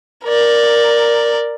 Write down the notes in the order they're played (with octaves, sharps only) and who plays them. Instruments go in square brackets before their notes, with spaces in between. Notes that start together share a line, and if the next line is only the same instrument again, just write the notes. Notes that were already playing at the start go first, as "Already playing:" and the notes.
[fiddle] A#4 D5